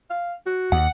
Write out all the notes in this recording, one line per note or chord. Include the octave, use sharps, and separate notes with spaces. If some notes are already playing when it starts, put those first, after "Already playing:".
F5
F#4
D#2 F#5